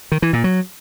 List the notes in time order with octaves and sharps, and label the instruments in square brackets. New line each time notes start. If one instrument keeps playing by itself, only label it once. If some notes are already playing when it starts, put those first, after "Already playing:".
[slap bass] D#3
E3
A#2
F#3